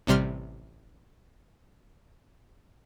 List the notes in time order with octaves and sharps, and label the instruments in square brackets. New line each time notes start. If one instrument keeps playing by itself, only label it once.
[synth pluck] A1 C3 G3 C6 F6